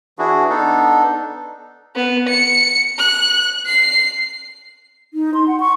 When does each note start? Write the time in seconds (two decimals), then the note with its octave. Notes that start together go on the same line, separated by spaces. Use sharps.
0.19 E3 D4 E4 F#4 G#4
0.49 B3 D4 D#4 A4
1.95 B3
2.28 C#7
2.98 F#6
3.66 C7
5.14 D#4
5.34 C6
5.48 F#5
5.60 C#6